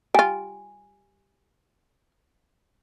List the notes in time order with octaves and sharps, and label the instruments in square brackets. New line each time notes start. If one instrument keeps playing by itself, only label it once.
[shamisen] G3 F4 [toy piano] G#5